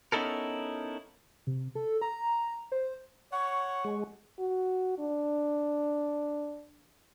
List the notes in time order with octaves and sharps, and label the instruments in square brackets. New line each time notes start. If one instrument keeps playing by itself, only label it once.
[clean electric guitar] B3 C#4 D#4 E4 A4 A#4
[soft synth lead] C3
A4
A#5
C5
[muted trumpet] C#5 [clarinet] F#5 [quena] C#6
[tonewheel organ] G#3
[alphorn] F#4
D4